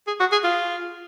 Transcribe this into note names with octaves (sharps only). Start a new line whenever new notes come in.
G#4
F#4
G#4
F4